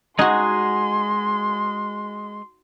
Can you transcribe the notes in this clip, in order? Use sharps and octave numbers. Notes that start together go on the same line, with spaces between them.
G#3 D#4 F#4 G#4 C6